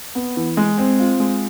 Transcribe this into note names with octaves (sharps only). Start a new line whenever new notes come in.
B3
E3
G#3
C4
F4
G#3